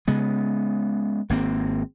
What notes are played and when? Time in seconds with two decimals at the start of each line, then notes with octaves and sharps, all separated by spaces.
0.08 C#3 G#3 B3
1.30 G#1 A#3 C4